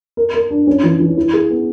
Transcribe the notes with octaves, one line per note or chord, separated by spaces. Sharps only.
A#4
A#4
D4
C#4
E3
E3
E4
G#4
B3